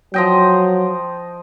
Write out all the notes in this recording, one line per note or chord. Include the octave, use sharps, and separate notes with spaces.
F3 F#3 D#5 G5